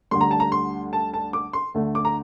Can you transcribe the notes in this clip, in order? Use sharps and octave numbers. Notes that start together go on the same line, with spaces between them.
D2 D3 G3 C6
A#5
A5
A#5
C6
A5
A5
D6
C6
D2 D3 A3
D6
A#5